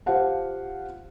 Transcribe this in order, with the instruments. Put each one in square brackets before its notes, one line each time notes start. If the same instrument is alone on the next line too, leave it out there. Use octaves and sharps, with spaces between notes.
[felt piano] F4 G4 C5 F5 F#5 A5